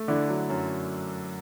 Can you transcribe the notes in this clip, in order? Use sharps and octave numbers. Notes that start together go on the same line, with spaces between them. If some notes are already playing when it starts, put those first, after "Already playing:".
Already playing: A3
D3 D4 E4
F#3
F#2